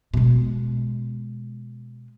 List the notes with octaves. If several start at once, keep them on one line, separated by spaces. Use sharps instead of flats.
B2 G#3